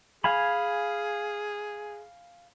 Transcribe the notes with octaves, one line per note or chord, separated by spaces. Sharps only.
G#4 F5 G#5 B5